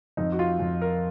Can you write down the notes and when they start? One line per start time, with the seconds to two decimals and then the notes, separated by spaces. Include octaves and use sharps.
0.17 F2 D#4
0.32 F#4
0.39 F4
0.60 F2
0.82 A#4